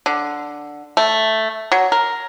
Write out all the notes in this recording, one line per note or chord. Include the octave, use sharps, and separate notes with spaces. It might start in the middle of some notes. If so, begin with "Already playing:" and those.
D3
A3
F#3
A#4